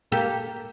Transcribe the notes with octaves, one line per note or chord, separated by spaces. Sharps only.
A#3 G4 A4